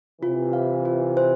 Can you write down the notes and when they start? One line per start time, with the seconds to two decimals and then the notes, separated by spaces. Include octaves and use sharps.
0.22 C3 E3 F4
0.53 F5
0.85 F4
1.17 C5